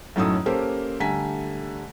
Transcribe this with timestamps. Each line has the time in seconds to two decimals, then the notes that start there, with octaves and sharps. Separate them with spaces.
0.16 F#2 A2 F#3 D#4 A4 D#6
0.46 A#3 C#4 G4 A4 A#4 C5
1.00 D3 G3 A3 G#5 A#5 B6